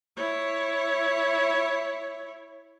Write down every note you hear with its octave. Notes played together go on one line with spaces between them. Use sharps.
E4 C#5